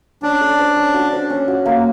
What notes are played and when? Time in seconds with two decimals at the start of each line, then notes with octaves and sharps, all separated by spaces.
0.23 C#4 D4
0.41 A4
0.59 C5
0.76 C#4
0.94 F#4
1.12 C5
1.30 C#4
1.48 F#4
1.66 A#3